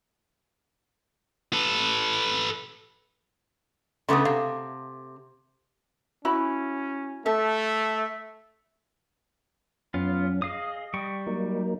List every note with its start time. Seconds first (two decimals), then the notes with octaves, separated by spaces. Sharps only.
1.53 A4 B4
4.09 C#3 A3 B3 C6 D6 D#6
4.25 C3 F5
6.25 C#4 E4 F#4 B5
7.26 A3 A4 E5
9.94 F#2 B3 C#4 F4
10.42 G#4 D#5 F5 D#6
10.94 G3 G5 C#6
11.27 F#3 A#3 D#4